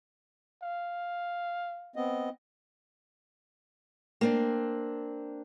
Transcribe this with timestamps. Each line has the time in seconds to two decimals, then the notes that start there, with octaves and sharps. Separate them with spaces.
0.62 F5
1.96 B3 C4 D#5
4.21 A#3 C4 D4